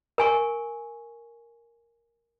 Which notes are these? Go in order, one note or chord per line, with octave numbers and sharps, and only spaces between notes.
A#4 G#5 C#6